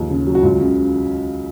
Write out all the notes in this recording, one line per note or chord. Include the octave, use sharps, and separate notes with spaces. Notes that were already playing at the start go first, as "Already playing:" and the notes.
Already playing: D#2 F3 G#4
C#3
F#3
F#4
C#2 F4
C#3